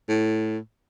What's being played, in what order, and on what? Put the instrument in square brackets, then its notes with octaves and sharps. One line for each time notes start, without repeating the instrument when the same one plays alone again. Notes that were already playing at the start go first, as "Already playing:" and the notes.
[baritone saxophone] A2